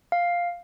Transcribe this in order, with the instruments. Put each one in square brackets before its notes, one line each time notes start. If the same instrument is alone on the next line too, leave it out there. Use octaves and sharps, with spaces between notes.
[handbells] F5